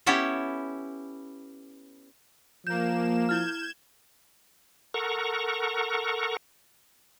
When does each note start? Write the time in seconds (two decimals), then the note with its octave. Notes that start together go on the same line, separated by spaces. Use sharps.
0.06 B3 C#4 E4 G4 A4
2.67 F3 A#3 G6 E7
3.29 E4 F6 G6 G#6 E7
4.94 A4 A#4 F#5 A#5 C#6